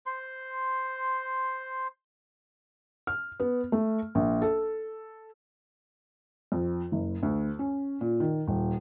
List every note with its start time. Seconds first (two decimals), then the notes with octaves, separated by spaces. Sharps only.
0.06 C5 C6
3.07 F6
3.40 B3
3.72 A3
4.15 A#1
4.42 A4
6.52 F2
6.92 F#1
7.23 D2
7.59 C#4
8.01 A#2
8.20 D#3
8.48 D#1